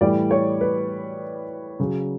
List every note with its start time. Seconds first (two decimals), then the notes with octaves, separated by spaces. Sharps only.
0.01 A2 E3 G3 D5
0.31 C#5
0.61 B4
1.80 C#3 F#3